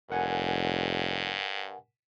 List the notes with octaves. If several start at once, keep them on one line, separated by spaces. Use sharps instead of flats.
F1 G2 A#4 F#5 G#5